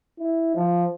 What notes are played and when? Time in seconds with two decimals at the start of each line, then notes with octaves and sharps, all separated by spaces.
0.19 E4
0.55 F3